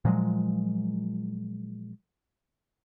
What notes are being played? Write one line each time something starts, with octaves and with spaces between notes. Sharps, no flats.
A#2 F3 F#3 G#3